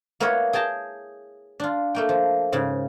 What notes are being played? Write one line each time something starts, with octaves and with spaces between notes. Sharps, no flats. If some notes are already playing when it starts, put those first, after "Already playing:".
A#3 B3 E4 A#4 B4 C#5
G#4 G5 A5 A#5
D4 F4
A3 A#3 G5
F3
G#2 C#3